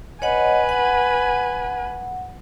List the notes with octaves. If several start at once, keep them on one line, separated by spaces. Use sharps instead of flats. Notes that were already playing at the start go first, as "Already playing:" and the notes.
B4 C#5 D#5 F#5 G#5
F#5